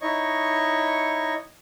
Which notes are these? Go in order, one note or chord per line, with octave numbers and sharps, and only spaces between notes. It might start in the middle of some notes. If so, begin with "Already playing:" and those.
D#4 E4 C#5 D#5 C#6